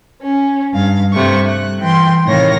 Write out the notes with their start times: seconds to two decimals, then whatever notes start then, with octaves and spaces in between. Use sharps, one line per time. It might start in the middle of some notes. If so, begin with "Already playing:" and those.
0.22 C#4
0.72 G2 F5
1.13 G2 C3 A3 C#6
1.47 F#6
1.80 E3 G5 C6
2.26 A2 C3 D#3 C#5 F5 A#6